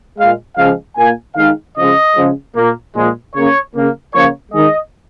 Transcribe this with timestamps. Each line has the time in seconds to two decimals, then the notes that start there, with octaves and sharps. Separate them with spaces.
0.17 A#2 G#3 F5
0.56 C#3 F3 G#3 F5
0.96 A#2 A#3 G#5
1.36 D#3 G#3 F5
1.75 C#3 F3 G#3 D#5
2.15 C#3 F3 G#3
2.55 A#2 A#3
2.94 A#2 F3 G#3
3.34 C#3 A#3 C#5
3.74 C#3 A#3
4.13 C#3 F3 A#3 C#5
4.52 D#3 G#3 D#5